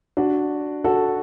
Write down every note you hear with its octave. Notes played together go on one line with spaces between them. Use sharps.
D4 F#4
F#4 A4